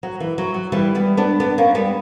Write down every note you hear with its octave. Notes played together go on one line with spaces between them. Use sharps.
F#3
E3
F#3
F#3
E3 G3
G3 B3
B3 D4
B3 D4
A#3 C#4
G3 B3